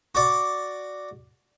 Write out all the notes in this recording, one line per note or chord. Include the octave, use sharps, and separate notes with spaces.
F#4 D5